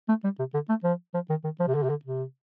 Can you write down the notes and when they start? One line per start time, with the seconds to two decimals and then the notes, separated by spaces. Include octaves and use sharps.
0.09 A3
0.24 G3
0.39 C3
0.54 D3
0.69 A3
0.84 F3
1.14 F3
1.30 D#3
1.44 D#3
1.60 F3
1.67 C3
1.75 D3
1.83 C3
1.89 D3
2.05 C3